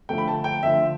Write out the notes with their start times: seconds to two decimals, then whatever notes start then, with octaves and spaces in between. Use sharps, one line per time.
0.09 D3 F3 A3 G5
0.18 B5
0.28 A5
0.44 G5
0.63 D3 F3 A3 E5